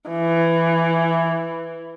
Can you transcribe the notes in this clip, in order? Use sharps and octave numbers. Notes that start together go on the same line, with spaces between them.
E3